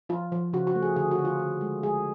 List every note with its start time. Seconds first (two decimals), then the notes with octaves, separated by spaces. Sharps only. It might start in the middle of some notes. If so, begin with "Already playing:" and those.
0.09 F3 F4
0.32 F3
0.53 C#3 F#4
0.67 F#4
0.75 A3
0.82 G#4
0.96 D3 G#4
1.11 F#4
1.19 D3
1.25 F4
1.39 D3
1.61 G#3
1.83 G#3 G#4